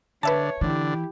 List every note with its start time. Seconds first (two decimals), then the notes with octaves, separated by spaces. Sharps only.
0.23 D3 B4 C#5 E5 A5
0.61 D3 E3 E4 G4